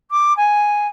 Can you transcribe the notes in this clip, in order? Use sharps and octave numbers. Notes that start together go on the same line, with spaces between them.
D6
G#5